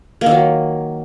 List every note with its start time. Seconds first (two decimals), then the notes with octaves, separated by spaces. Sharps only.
0.21 A#3
0.26 D#3
0.31 F#3